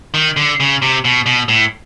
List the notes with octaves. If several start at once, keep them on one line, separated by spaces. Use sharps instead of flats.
D#3
D3
C#3
C3
B2
B2
A2